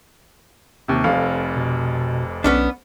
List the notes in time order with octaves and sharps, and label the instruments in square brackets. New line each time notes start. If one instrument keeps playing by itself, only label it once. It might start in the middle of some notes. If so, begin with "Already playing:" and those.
[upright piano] D#2 C3
F1 F2 F5
[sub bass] B2
[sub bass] B1 [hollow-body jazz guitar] B3 C#4 D4